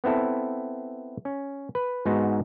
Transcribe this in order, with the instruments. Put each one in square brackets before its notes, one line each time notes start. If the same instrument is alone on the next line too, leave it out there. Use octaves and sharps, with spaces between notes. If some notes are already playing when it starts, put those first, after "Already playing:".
[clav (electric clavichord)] B3 C4 E4 A4
C#4
B4
G#2 B3 D#4 F#4